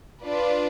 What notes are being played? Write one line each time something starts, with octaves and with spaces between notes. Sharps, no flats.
D4 F4 B4 D5